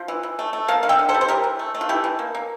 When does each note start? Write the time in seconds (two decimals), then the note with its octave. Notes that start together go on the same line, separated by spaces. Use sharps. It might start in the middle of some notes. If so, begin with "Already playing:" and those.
Already playing: F3
0.08 E3
0.23 E3
0.39 A3
0.53 A3
0.68 A#3 F5 A5
0.83 D3 F5
0.89 E5 G5
0.99 D3
1.09 A4 C5
1.14 G3
1.21 C5
1.28 E3 G4 A#4
1.44 E3
1.59 A3
1.74 A3
1.81 F4
1.89 E3 E4 G4
2.04 E3
2.19 A#3
2.35 A#3